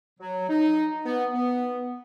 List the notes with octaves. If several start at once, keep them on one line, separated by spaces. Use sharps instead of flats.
F#3
D#4
B3
B3